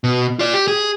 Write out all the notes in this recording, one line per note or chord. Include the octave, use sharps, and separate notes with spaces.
B2
F4 D5
G4
G#4